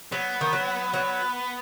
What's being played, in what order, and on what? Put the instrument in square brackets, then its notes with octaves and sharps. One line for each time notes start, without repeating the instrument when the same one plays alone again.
[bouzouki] F#3 [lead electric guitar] B3
[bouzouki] D#3
F#3
F#3